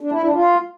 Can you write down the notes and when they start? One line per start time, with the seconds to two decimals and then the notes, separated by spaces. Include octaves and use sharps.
0.01 D4
0.12 E4
0.23 D4
0.34 F4